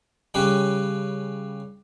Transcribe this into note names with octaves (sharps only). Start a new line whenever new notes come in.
C#3 G3 C#4 G4 B4